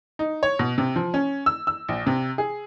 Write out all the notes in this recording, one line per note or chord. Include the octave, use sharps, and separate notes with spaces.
D#4
C#5
B2
C3
F3
C#4
E6
E6
A#1
C3
G#4